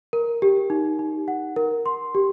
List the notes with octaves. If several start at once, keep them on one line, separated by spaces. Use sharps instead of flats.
A#4
G4
D#4
D#4
F#5
A#4
C6
G4